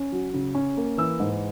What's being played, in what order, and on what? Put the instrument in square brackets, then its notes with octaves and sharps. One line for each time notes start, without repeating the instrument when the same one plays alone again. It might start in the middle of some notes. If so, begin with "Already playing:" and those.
Already playing: [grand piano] C#4
F#3
C#3
C#4
A#3
E3 E6
G#2